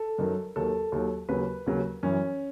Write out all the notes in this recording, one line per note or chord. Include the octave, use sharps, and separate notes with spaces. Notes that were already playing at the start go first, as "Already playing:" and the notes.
Already playing: A4
F#2 D#3 F#3
D#2 D#3 F#3 A4
D#2 D#3 F#3
D#2 C#3 F#3 B4
D#2 C#3 F#3
F#2 E3 C#4